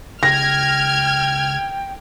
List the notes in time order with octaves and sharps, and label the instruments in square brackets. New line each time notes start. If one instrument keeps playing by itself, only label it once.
[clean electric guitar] C#2 [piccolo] G5 [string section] F6 G#6 [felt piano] A#6